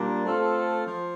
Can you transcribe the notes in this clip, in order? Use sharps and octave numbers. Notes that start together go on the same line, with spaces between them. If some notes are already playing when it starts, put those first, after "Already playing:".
Already playing: A#2 G3 A#3 D4
A3 C4 F4 A4
F3